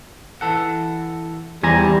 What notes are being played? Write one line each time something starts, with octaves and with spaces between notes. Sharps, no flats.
E3 A4 F#5
E2 E3 G3 B3 C5 G#5 A#5